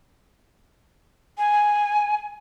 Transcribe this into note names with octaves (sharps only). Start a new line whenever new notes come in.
G#5